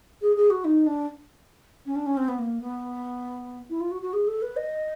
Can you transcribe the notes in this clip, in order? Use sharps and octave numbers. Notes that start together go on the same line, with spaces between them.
G#4
G#4
F#4
D#4
D4
C#4
D4
C#4
C4
B3
A#3
B3
E4
F4
F#4
F#4
G#4
A4
B4
D#5